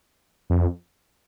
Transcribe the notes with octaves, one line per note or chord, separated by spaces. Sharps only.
F2